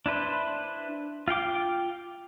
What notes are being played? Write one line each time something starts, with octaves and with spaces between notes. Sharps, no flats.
D4 E4 B4 C5
F4 F5 G5 D6